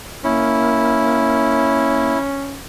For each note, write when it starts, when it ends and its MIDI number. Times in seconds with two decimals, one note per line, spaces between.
0.24 2.15 58
0.24 2.60 61
0.24 2.19 64